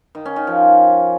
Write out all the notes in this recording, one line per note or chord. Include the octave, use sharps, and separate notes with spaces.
D#3
C#4
D#3
F3